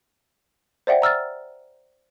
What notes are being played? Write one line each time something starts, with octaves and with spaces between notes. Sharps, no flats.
C5 D5 E5 F#5 G5
A#5 E6 F6 A6